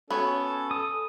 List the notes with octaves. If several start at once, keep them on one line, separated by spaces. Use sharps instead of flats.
B3 C#4 F#4 A4 C#5
D#6